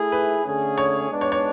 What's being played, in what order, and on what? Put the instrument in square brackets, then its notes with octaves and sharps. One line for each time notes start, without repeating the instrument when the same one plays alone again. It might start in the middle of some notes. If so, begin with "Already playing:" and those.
Already playing: [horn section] A3 E4 G#4
[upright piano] B4
[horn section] D3 A3 C#4 G#4
[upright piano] C#5
[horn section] G#3 B3 D4
[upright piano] C#5
C#5